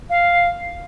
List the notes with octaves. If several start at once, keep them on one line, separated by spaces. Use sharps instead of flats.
F5